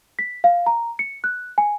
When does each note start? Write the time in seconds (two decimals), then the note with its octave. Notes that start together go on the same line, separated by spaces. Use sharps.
0.19 B6
0.44 F5
0.66 A#5
0.99 C#7
1.24 F#6
1.58 G#5